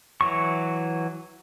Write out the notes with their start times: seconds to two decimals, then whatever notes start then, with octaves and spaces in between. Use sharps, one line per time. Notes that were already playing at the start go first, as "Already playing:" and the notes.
0.21 E3 F#3 C#6